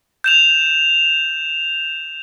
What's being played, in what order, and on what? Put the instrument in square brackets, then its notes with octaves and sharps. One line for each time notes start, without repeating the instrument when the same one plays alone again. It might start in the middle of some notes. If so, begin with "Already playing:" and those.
[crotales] G6 E7 F7